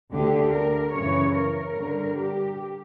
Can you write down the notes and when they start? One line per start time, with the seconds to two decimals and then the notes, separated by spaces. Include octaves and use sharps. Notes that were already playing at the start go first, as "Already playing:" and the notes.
0.13 D2 D3 G4
0.53 A#4
0.94 F#2 C#3 E3 C#5
1.35 A#4
1.76 G2 D3
2.17 G4